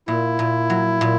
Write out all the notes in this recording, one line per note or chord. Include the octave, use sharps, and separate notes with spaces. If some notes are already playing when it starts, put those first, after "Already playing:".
A#2 E4
A#2
F#3
A#2